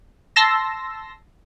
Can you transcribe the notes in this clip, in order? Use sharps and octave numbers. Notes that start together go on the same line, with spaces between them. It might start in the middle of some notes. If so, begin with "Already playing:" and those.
A5 C6 E6 A#6